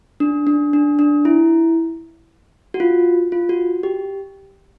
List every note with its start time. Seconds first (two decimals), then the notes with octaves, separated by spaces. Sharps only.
0.20 D4
0.47 D4
0.73 D4
0.99 D4
1.25 E4
2.74 F#4
2.80 F4
3.32 F4
3.49 F#4
3.83 G4